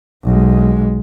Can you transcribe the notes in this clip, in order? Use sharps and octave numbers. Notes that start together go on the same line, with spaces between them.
B1 G#3